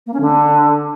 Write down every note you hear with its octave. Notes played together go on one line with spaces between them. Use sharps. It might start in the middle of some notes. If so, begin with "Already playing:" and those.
A#3
C#4
D3